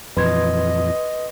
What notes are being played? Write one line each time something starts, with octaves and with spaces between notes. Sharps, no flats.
F2 A#2 E3 B4 D#5 C6 G#6